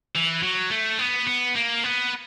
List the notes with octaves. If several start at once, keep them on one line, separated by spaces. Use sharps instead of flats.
E3
F#3
A3
B3
B3
A#3
B3